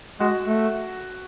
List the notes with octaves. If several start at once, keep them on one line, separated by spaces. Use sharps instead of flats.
G#3 F#4 F#5
A3